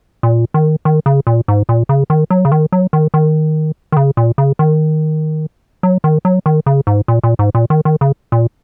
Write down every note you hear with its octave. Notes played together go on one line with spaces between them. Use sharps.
A#2
D#3
D#3
C#3
A#2
G#2
A#2
C#3
D#3
F#3
C#3
D#3
F#3
D#3
D#3
D#3
C#3
A#2
C#3
D#3
F#3
D#3
F#3
D#3
C#3
G#2
A#2
A#2
G#2
A#2
D#3
D#3
C#3
A#2